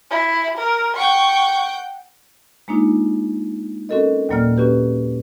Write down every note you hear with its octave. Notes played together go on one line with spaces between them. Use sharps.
E4
A#4
F#5 G5 C#6
G#3 A#3 D4 D#4 F4
C4 C#4 F#4 A4 A#4 D#5
D#2 A#2 F#3 A#3 D5 F6
C#4 F#4 G4 B4